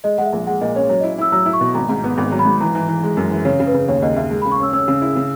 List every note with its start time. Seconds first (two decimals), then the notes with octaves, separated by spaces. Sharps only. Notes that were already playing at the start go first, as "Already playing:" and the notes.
0.04 G#3 D#5
0.18 G#3 F#5
0.25 E5
0.33 A#1
0.47 G#3 F#5
0.61 A#2 D#5
0.76 C#4 C#5
0.89 F#3 C#5
1.00 D#5
1.03 E4
1.18 E4 E6
1.32 F#3 E6
1.46 E4
1.53 C#6
1.61 B2
1.74 G#1 A#5
1.89 G#2
2.04 B3
2.18 G#1
2.32 F#3
2.39 B5
2.46 G#2
2.60 E3 A#5
2.75 E3
2.89 E3
3.03 G#3
3.17 F#2
3.31 E3
3.45 C#3 C#5
3.60 C#3
3.67 B4
3.74 C#3
3.88 D#2 C#5
4.02 D#2 D#5
4.16 D#2 E5
4.31 G#3
4.42 B5
4.46 C#3
4.52 C#6
4.60 C#4 E6
4.73 C#4 E6
4.88 C#3
5.02 E4
5.16 C#3